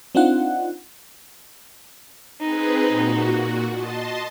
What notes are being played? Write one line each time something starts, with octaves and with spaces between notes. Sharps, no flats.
C4 D4 D#4 F4 F#5
C4 D#4 G#4 B4
A#2 F#4
D#5 A5 C6